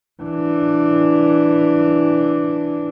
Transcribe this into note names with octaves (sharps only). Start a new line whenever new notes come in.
E3 D4